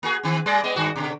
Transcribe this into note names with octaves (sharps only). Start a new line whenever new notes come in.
A#3 F#4 G#4
D#3 C4
G3 G#4 D5
G#3 B3 D#5
G2 D#3 F#4
B2 D3